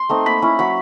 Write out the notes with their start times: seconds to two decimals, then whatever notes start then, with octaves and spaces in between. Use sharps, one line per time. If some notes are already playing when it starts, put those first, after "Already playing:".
Already playing: C6
0.09 A3 C4 D#4
0.26 A#3 B5
0.42 C#4 E4
0.59 F#3 B5